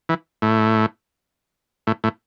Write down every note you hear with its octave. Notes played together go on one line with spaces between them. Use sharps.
E3
A2
A2
A2